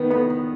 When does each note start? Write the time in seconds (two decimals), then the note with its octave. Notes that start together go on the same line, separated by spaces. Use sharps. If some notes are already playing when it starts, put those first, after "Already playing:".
Already playing: D#3 B3
0.10 B3